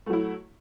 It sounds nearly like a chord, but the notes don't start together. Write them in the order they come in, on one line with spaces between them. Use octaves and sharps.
A3 F#3 E4